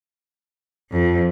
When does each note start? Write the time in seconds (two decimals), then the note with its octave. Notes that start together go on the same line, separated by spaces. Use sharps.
0.91 F2